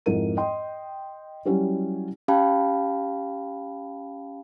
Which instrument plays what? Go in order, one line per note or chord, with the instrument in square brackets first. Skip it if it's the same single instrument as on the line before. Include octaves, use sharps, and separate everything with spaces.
[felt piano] F2 G#2 C4 E4 A#4 D#7
D#5 G5 C6
F#3 G3 C#4 E4 F#4 G4
[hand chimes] C#4 G4 F5 G5 A5 B5